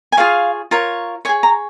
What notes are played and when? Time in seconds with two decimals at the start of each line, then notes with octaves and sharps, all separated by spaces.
0.12 G#5
0.17 F4 G#4 C#5 F5
0.71 F4 A#4 C#5
1.25 C#5 G#5
1.29 G#4
1.43 A#5